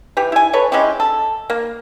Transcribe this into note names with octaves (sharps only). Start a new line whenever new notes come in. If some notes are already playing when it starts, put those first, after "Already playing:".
E3 G4
E4 G#5
A4 B4 C#5
G#3 C#4 E4 G4
A4
A#3